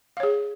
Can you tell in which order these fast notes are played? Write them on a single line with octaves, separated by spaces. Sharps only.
F5 C#5 G#4